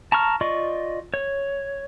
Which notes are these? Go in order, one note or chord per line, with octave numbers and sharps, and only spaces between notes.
A5 A#5 C#6 F6
F4 D5 D#5 C#6
C#5